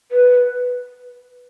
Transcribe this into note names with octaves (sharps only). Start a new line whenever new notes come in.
B4